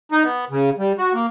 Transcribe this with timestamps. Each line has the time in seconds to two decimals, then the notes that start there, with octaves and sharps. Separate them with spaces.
0.12 D#4
0.23 B3
0.50 C#3
0.78 G3
0.98 F#4
1.14 A#3